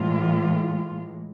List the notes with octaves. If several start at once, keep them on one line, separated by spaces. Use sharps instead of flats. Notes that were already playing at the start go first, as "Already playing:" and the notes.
Already playing: A2 E3 G#3 F4